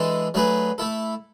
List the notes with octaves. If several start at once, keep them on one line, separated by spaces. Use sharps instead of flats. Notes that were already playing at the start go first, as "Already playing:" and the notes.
Already playing: E3 G#3 D4 A4
F#3 A3 D4 G#4 B4
A3 E4 A4